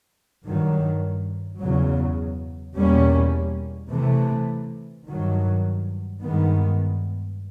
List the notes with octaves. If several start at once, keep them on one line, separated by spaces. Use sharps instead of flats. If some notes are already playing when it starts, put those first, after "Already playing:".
G2 D#3 F#3
E2 C#3 F#3
E2 B2 G3 A#3 C#4
C3 E3 A3
G2 D#3 F#3
G2 D#3 G#3 B3